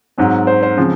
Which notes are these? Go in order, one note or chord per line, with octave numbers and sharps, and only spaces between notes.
G#2 F#3 C4
C5
C5
C#3 F3 G#3 C4